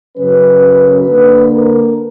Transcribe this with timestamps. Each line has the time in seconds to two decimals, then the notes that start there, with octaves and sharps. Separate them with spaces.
0.17 F#2 C#3 F#3 C#4 B4
1.07 D3 A#3 D4 B4
1.52 A#4